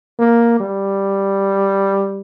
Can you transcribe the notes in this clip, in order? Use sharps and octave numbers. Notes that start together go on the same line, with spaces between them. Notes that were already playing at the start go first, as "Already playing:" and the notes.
A#3
G3